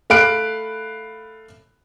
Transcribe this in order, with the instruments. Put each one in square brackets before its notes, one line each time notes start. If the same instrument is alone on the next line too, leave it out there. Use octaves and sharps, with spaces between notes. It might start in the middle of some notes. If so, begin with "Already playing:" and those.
[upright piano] A3 F5 B5 F#6 D7